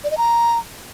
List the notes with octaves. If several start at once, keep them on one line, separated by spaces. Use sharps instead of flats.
D5
D#5
A#5